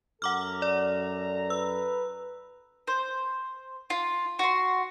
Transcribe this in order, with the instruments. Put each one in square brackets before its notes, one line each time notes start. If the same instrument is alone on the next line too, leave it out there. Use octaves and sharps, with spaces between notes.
[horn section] F#2 A4 A#5 [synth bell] F#5 D6 F6
[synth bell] D5
[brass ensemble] B4 [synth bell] E6
[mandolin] C5
F4
F#4 C6